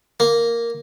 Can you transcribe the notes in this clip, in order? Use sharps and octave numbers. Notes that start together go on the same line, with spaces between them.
A#3